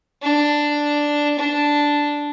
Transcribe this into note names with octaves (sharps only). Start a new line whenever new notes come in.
D4
D4